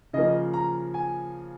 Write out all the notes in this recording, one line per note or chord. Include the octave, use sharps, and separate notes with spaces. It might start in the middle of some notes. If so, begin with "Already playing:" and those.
C#3 F3 A#3 D#5
A#5
G#5